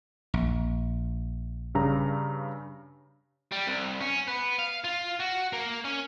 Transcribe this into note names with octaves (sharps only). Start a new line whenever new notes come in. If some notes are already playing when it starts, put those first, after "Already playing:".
A#1
G2 C#3 A#5
G3
C2
C#4
B3
F5
F4
F#4
A#3
C#4